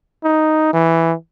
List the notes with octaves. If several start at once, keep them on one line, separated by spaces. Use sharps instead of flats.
D#4
E3